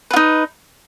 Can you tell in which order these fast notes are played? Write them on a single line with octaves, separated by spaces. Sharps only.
B4 F4 D#4